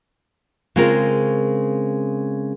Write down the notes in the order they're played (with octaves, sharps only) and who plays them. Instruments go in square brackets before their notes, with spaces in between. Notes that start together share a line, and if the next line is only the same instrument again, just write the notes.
[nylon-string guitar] C#3 G#3 C4 F4 A#4